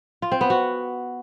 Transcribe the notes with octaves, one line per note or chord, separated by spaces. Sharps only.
F4
C4
B3
F#4